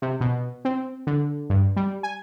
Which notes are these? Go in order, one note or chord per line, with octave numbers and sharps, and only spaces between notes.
C3
B2
C4
D3
G2
G3
G#5